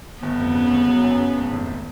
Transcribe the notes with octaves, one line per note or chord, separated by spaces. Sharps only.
G1 B3
F2
C#3
G1
F#3
F#2
C#3
G#1
F1